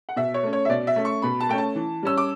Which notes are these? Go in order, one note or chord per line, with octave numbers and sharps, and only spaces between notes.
F#5
B2 E5
C#5
A3 C#4
C#5
E5
B2 D5
E5
A3 C#4
C#6
B2 B5
A5
A3 C#4 G5
A5
E3
G3 C#4 E6
D6